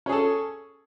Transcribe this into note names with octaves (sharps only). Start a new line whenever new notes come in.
C#4 G#4 A4